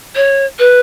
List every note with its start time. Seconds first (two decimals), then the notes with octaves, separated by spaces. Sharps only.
0.16 C#5
0.59 B4